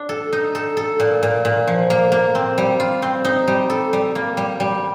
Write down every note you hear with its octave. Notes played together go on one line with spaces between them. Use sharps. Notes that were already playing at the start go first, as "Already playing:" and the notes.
Already playing: D4
A4
D#4
A4
A4
A#2
A#2
A#2
F3
A#3
A#3
C4
G3
F4
C4
D#4
G3
A4
G3
A#3
G3
G3